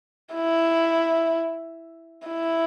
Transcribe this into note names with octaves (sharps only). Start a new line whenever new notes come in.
E4
E4